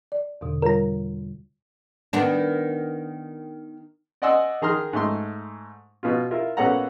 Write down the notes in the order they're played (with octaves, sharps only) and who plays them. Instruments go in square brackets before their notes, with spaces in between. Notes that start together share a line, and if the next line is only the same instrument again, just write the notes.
[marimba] D5
E2 B2 D3
[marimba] G3 F4 C#5 [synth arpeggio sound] A#4 A#5
[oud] D#3 B3 D4
[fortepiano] D5 D#5 F#5 G#5 C6 E6
D#3 G#4 A#5 C6 F6
G#2 A3 C6
B2 F4
E4 F4 A#4
A#1 B3 C#4 A4 F#5 A#5